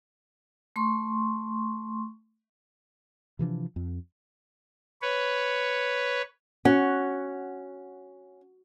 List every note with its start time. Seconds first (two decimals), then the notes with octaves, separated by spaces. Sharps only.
0.76 A3 C6 C#6
3.39 C3 E3 F3 D4
3.76 F2
5.02 B4 C#5
6.65 C#4 F#4 F#5